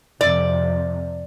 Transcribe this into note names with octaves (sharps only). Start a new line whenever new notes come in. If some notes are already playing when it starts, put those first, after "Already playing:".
F2 C3 D5